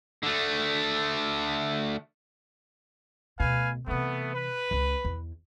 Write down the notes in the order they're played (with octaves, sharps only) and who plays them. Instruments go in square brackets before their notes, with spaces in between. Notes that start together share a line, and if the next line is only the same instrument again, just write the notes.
[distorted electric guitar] D3 A3
[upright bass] D2 B2 [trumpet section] B4 F5 G#5
[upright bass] C3 E3 [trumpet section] A3 B3
[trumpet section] B4
[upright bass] C#2 C#4
E2